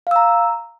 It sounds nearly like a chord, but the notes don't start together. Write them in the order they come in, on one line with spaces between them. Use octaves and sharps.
F5 E6 A#5